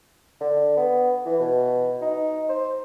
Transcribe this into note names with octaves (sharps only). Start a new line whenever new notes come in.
D3
B3
E3
B2
D#4
C5